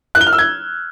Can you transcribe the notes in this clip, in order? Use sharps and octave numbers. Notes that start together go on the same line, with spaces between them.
F#6
G7
F6
E6
G#6